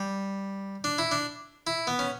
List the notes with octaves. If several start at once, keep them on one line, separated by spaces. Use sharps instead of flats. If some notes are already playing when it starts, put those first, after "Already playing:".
Already playing: G3
D4
E4
D4
E4
B3
C#4